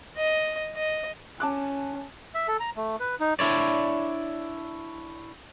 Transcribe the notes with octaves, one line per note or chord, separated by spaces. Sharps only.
D#5
D#5
C#4 A5 D6 F#6
E5
A4
A#5
A3
B4
D#4
D4 E4 C#5 D5